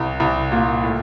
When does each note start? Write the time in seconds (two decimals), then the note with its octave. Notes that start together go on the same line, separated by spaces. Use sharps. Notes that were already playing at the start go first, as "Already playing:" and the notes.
Already playing: C2
0.20 C2
0.52 A#2
0.83 A2